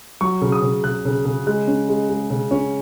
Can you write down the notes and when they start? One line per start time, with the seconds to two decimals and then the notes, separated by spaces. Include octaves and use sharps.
0.21 F#3 C#6
0.42 C#3
0.52 D#6
0.62 C#3
0.84 C#3 F#6
1.05 C#3
1.25 C#3
1.47 G#3 F#6
1.68 C#4
1.89 G#3
2.10 G#3
2.30 C#3
2.51 C#4